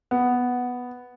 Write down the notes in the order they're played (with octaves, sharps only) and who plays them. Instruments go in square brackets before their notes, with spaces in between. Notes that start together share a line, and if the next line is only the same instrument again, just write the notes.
[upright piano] B3